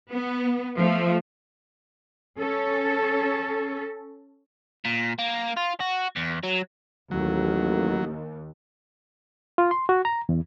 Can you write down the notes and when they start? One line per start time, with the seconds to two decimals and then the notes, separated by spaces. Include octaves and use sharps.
0.11 B3
0.79 F3 A3
2.39 C#4 A4
4.85 A#2
5.19 A#3
5.57 F4
5.80 F#4
6.16 E2
6.43 F#3
7.11 A1 D#2 F#3
9.58 F4
9.71 C6
9.89 F#4
10.05 A#5
10.29 E2